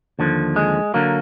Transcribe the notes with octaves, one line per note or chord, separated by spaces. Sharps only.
D#2 D3 F3
G#3
D3 F#3 A#3